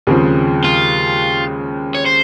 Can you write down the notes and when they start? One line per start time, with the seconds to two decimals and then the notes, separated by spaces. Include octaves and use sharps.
0.07 D#2 C#3 F3 G#3 C4
0.64 F4
1.95 C#5
2.06 C5